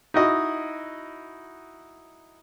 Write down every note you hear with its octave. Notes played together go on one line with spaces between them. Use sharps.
D#4 E4 F#4 D#5